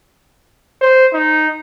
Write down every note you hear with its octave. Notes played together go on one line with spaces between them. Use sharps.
C5
D#4